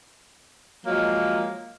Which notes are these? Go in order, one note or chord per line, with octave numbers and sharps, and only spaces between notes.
F3 F#3 G#3 A#3